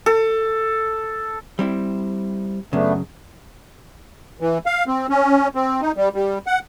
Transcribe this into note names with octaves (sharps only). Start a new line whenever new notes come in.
A4
G3 C4 E4
F#2 C#3 A3 B3 D4
E3
F5
C4
C#4
C4
D#4
G3
G3
F#5